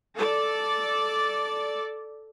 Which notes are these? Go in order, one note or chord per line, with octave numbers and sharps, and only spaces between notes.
A4 D5